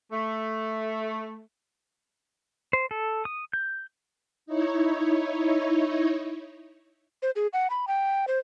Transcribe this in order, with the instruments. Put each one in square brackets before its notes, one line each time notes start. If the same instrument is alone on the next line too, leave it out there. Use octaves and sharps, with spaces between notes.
[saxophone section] A3
[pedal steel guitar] C5
A4
D#6
G6
[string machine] D#4 E4 C#5
[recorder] C5
G#4
F#5
B5
G5
C5